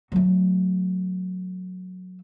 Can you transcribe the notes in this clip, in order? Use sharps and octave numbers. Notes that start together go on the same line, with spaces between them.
F#3 A3